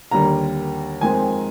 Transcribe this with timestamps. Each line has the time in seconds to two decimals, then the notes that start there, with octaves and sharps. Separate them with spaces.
0.11 D#2 D3 G3 A#3 A#5
1.01 F2 D#3 G#3 C4 G#5